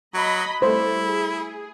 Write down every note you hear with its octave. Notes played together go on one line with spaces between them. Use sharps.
F#3 D#5 B5
G3 A3 E4 A4 C5
G#4